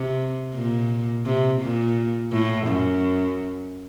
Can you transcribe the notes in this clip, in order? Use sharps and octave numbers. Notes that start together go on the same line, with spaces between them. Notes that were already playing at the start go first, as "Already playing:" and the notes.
Already playing: C3
A#2
C3
A#2
A2
F#2